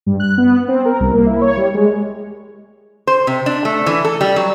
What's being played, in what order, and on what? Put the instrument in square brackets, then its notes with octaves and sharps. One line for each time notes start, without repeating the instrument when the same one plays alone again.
[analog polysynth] G2
F#6
B3
C4
A#4
C2
A#3
E4
C#5
G3
G#3
[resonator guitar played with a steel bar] C5
C3
D4
A3
E3
A4
G3
F#3